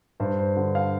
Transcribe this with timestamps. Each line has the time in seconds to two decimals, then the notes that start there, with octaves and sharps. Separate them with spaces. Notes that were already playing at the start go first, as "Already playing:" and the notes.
0.20 G2 C5
0.38 C5
0.56 D3
0.75 F5